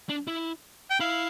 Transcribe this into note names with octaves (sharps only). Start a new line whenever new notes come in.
D4
E4
G5
E4 F5